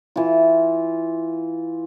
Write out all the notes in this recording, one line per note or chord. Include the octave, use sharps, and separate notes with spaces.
E3 F4